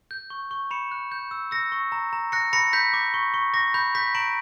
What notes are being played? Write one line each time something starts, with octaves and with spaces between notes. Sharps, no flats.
G6
C#6
C#6
B5 C#7 E7
F#6
G6
E6
E6 A#6 C#7
C#6
A#5
A#5
F#6 A#6 C#7
B5 A#6 C#7
B5 G6 B6
D6
C#6
C#6
D6 A#6
B5 G6
D6 G6 B6
A#5 D7 F#7